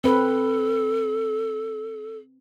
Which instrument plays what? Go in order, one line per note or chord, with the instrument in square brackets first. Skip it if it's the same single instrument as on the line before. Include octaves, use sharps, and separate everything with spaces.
[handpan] C4 B4 [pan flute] A4